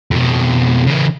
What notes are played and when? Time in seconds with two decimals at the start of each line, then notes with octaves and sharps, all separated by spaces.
0.11 F2 B2
0.86 C#3 E3